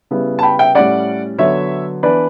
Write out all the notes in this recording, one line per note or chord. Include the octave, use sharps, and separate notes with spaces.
C#3 G3 B3 E4
A5
G5 B5
E5 G5
A2 G3 C#4 D5 F#5
D3 F#3 B3 C#5 E5
E3 B3 D4 B4 D5